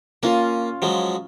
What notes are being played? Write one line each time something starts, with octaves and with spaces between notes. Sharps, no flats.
A#3 C#4 F4 F5
F3 F#3 G#3